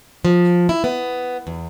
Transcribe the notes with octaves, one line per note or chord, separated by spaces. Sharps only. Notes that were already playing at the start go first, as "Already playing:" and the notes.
F3
E4
B3
E2